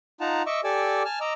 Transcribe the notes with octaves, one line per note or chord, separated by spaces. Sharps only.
D#4 F4 F#5 A5 A#5
D#5 E5 C#6 D6 E6
G4 A4 D5 G#5 D6 E6
G#5 A5 F6
D#5 A#5 D6 E6